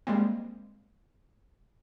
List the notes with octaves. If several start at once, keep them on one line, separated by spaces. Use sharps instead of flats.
G3 G#3 A#3 C4